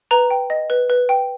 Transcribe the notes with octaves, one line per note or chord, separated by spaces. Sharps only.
B4 A#5
G5
D#5
B4
B4
G5